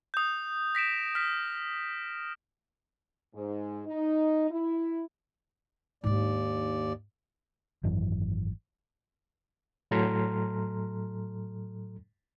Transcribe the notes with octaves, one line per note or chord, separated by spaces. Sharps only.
D#6 G6
A#6 B6 D7 E7
F6 B6
G#2
D#4
E4
D#2 G#2 D4 D5
G#1 F#2 E3
A2 F#3 A4 A#5 C6 F6